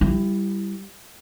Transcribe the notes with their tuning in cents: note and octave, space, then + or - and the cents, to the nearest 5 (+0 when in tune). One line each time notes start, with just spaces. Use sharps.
G3 +0 E4 +20